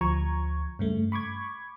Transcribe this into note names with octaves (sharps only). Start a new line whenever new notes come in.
D2 F3 A#5 C#6 G#6
G2 C#3 A3
B5 C#6 D6 G#6